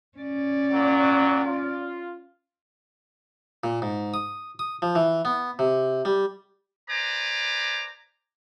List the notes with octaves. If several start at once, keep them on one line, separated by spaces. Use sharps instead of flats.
C#4 D5
A#2 F#3
F4
A#2
G#2
D#6
D#6
F3
E3
B3
C3
G3
B4 C5 D5 G#5 A#5 D6